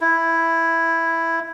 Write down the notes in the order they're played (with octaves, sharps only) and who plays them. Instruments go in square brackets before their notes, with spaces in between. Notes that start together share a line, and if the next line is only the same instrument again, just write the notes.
[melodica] E4